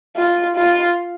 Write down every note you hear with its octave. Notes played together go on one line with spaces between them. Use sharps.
F4
F4